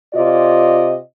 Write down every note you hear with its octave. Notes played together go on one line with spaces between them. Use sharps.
C3 F4 D5 D#5